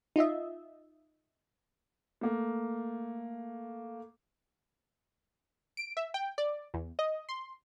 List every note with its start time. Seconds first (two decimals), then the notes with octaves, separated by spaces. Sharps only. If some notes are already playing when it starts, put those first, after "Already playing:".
0.16 D#4 F4 D#5 E5
2.21 A3 A#3
5.77 D7
5.97 E5
6.14 G5
6.38 D5
6.74 E2
6.99 D#5
7.29 C6